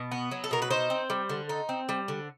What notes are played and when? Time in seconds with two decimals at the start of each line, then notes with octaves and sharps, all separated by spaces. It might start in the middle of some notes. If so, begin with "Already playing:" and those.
Already playing: B2
0.11 B3
0.31 F#3
0.44 A4
0.51 B2 A#4
0.62 B4
0.70 D#4 C5
0.90 C4
1.10 G3
1.29 D3
1.49 D#4
1.69 C4
1.89 G3
2.08 D3